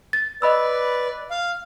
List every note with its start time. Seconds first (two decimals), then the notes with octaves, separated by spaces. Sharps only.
0.13 A6
0.42 B4 D5 D#5 B5 E6
1.30 F5